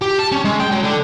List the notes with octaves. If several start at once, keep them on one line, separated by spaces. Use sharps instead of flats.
G4
A5
C#4
G#3
G5
F#3
D3